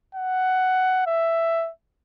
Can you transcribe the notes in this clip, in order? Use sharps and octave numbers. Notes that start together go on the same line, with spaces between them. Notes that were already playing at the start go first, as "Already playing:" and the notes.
F#5
E5